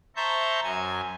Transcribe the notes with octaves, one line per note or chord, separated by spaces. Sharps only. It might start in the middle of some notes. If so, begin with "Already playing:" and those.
C5 E5 A5 A#5 C#6 G6
F#2 G#5 G#6